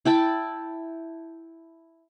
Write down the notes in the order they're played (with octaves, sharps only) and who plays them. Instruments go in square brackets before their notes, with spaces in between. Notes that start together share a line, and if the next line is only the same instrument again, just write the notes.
[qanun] E4 G5 A5 B5